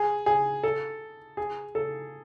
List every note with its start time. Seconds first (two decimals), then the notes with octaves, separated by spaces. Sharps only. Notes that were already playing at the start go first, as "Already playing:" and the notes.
Already playing: G#4
0.26 G#4
0.63 A4
1.37 G#4
1.75 A4